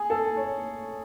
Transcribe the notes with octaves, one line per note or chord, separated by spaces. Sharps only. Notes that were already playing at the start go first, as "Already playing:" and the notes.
Already playing: G#4
A4
C#5